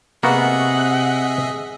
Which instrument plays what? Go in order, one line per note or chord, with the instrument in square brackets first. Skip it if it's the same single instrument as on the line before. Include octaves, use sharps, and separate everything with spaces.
[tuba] C3 [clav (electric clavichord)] A#3 B3 F#4 [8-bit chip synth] G#4 D#5 E5 [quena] F#5